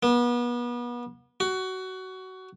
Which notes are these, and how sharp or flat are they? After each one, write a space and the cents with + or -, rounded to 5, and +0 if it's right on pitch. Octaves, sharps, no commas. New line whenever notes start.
B3 -35
F#4 +20